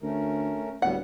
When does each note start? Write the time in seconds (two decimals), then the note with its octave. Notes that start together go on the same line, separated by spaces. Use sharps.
0.02 D2 A3 C#4 A#4
0.82 D1 F#3 G3 B3 F#5